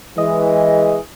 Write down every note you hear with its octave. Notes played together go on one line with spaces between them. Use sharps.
E3 G#3 D#5